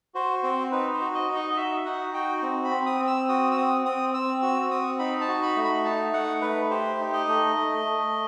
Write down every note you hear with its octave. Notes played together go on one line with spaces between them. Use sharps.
F#4 C5
C4 C5
D#4 B4
C5
F#4
D#5
D#4
D#5
D#5
F#4 E5
D#4 F#5
F#4 G5
C4
B5
C4
D#6
C4
E6
F#4 D#6
E6
C4 D#6
C4 D#6
C4 E6
F#4 E6
C4 D#6
D#4 B5
A5
F#4
B5
A3
B5
D#4 A5
A3 F#5
A3 B4
G4 C5
D#4
D#5
A3
A3
A3